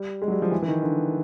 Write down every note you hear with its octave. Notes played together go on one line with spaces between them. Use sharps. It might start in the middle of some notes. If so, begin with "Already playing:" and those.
Already playing: G3
G#3
F#3
G3
F3
E3
E3
D#3
D3